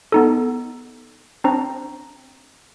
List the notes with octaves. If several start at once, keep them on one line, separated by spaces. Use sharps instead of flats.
B3 D#4 A4
C4 D4 C5 A#5